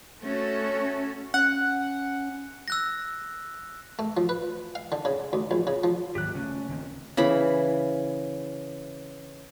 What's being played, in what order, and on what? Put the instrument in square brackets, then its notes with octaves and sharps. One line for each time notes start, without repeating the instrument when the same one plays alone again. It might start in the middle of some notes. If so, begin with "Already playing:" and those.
[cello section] A3 C#4 F#4 A4
[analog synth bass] C#4 [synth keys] F#5
[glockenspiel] E6 F#6 A#6
[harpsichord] A3
F3
B4
F5
D3
C#3
D2
A#1
C#3
F3
[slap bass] G#1 D#2 F#3 [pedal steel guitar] G4 F#6
[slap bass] C#3 A3 [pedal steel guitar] C#4
[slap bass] C#2 D#3 C4
[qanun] C#3 E3 B5